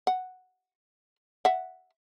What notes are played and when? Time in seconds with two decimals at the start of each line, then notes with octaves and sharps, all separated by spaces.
0.07 F#5
1.45 E5 F#5